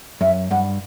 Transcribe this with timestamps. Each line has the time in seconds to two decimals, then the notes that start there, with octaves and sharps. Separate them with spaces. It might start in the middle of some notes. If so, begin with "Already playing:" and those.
0.21 F#2 E5
0.51 G2 F#5